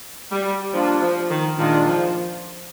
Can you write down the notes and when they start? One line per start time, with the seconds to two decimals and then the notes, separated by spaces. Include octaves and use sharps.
0.31 G3
0.73 F3 G3 A#3 D4 F4
1.02 F3
1.30 D#3
1.58 A#2 D#3 G#3 D4 F4
1.87 F3